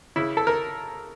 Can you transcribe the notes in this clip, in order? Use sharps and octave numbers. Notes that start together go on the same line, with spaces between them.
C#3 E4
A4
A#4